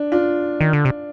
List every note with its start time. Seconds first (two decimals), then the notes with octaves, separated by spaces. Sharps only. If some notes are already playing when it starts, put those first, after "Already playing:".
Already playing: D4
0.12 D4 F4
0.61 D#3
0.73 D3
0.85 C3